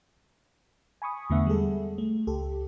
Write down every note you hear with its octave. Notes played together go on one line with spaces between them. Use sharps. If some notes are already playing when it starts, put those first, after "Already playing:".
G#5 B5 C#6 D#6
E2 D3 A3 B3 E5 F#5
G3 G#3 G#4 A4
A3
C#2 G4 A4